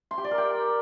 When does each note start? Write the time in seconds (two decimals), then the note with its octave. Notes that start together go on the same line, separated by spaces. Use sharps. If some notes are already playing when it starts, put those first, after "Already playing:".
0.11 C6
0.18 G4
0.24 D5
0.31 A#4
0.38 G5